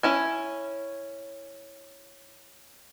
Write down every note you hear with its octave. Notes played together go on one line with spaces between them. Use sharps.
C#4 E4 G#5